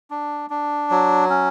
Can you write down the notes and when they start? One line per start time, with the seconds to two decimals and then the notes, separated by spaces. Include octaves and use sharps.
0.11 D4
0.50 D4
0.91 F#3
1.30 C#4